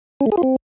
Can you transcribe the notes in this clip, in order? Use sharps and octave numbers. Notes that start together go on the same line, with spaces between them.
C#4
A3
G#4
F4
C4